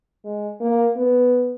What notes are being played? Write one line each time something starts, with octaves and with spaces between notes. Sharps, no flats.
G#3
A#3
B3